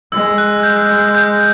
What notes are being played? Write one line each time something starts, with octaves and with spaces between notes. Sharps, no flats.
G#3 E6
F#6
G6
G6